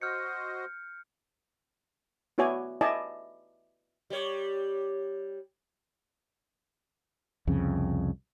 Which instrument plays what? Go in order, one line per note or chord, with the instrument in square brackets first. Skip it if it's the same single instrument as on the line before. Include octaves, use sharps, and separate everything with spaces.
[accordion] F#4 C5 D#5 [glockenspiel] F6 G6 C#7
[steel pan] B3 E4 F#4 C#5 D5 G#5
E4 D5 D#5 G#5 A5
[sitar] G3 C#5
[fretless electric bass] C2 F2 C#3